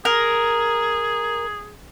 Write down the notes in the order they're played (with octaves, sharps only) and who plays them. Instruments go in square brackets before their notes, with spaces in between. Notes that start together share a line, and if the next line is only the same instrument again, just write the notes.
[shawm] G#4 [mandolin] A#4